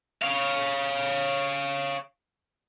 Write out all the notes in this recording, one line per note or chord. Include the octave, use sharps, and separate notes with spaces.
C#5 F5